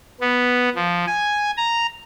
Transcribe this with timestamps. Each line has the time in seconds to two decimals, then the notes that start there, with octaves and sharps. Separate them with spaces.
0.21 B3
0.76 F3
1.07 G#5
1.57 A#5